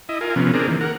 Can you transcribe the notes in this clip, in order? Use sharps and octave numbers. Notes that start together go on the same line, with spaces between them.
E4 D#5
F4 A#4 G#5
C3 F3 B3 C#4
C4 D4 G#4 A#4
D#3 E3 A#3
A#4 F#5